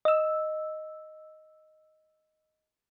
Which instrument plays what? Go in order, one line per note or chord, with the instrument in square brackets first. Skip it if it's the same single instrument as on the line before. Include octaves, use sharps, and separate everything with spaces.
[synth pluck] D#5 E6